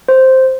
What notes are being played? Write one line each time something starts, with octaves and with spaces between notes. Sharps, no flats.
C5